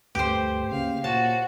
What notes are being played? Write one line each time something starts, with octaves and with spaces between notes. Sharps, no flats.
D2 G2 A3 G4 B4 C5
C#3 A#3 F5
A#2 F#4 C5 C#5 A5